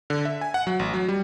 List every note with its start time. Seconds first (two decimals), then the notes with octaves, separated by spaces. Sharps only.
0.10 D3
0.25 E5
0.41 G#5
0.54 F#5
0.67 F#3
0.79 A1
0.94 F#3
1.08 G3